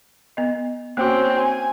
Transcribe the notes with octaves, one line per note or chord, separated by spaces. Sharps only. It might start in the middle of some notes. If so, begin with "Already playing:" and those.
B3 D#5
A#3 C4 C#4 F#4
G#5